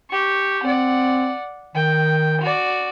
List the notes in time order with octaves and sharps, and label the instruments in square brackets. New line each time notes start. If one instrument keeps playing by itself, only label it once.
[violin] G4 C#6
[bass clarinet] C4 [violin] D5 F#5
[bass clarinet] D#3 [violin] G5
[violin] F#4 D5